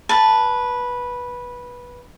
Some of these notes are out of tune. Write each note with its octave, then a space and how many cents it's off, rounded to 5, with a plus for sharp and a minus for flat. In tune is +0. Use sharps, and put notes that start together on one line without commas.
B4 -10 A5 +0